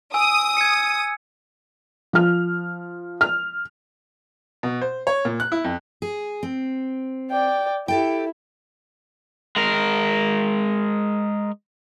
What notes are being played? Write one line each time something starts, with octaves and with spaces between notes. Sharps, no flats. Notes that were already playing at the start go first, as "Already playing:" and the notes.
G#5 D#6 E6
G#6 C#7
F3 F6
F6
B2
C5
C#5
A#2
F#6
E4
F2
G#4
C4
D5 G5
E4 G4 A4 G5
G#3 A#4